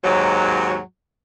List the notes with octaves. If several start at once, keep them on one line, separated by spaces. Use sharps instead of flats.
D#2 G#2 F#3